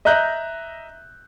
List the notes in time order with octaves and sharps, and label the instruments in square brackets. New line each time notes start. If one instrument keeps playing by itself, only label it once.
[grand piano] D#5 E5 A#5 F#6 G6